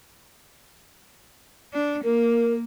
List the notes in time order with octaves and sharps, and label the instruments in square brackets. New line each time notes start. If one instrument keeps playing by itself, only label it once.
[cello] D4
[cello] A#3 [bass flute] A#4